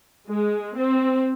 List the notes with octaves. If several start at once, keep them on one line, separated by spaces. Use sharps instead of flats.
G#3
C4